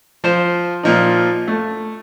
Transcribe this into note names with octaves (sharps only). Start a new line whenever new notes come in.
F3 C5
A#2 F3 D#4
A3